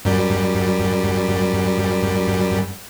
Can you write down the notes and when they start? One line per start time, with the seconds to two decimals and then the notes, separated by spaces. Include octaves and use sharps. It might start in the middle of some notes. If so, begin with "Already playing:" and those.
0.05 F#2 G3